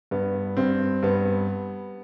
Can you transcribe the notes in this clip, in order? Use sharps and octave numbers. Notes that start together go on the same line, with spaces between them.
G2 B3
G2 C4
G2 B3